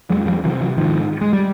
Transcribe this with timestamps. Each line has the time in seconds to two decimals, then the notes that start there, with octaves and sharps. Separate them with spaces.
0.10 F2 F#3 G#3
0.26 F3 G3
0.44 C3 E3 F#3
0.61 E3 F#3
0.78 G#2 D#3 F3
1.21 G#3
1.33 G3